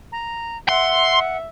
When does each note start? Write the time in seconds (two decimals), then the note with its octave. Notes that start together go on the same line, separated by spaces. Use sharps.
0.12 A#5
0.69 E5 F#5 C6